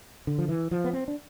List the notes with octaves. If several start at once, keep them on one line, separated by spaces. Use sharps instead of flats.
D3
F3
E3
F3
B3
C4
D4